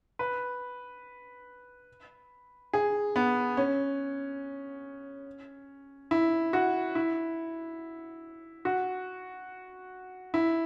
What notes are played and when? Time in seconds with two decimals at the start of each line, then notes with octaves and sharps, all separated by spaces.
0.19 B4
2.73 G#4
3.16 B3
3.57 C#4
6.11 E4
6.53 F#4
6.95 E4
8.65 F#4
10.34 E4